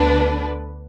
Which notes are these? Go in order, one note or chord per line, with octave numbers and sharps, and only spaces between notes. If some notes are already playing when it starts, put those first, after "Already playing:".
Already playing: D2 D3 B3 D4 B4